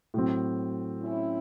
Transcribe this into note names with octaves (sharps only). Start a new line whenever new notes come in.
A2 F#3 C4
C#4 E4